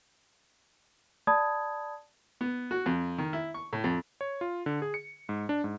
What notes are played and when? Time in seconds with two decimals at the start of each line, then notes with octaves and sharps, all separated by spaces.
1.27 D5 A5 B5 D#6 G#6
2.41 B3
2.71 F#4
2.86 F2
3.18 D#3
3.33 E4
3.54 C#6
3.73 A2
3.84 F2
4.21 C#5
4.41 F4
4.66 D3
4.82 G#4
4.94 C#7
5.29 G#2
5.49 D4
5.64 G#2